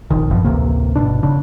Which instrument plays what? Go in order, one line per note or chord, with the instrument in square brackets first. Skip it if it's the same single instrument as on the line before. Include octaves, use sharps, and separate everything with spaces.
[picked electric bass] F1 A#1 D#3
G#1 F#2 E3 F3
A1 D2 C3 A#3
G1 C2 B2 D4
F1 C#3 D4